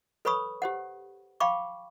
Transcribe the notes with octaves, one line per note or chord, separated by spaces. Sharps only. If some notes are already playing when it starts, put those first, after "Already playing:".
A4 B4 C#5 B5 C#6 D#6
G4 C5 F#5
F5 G5 B5 C#6 D6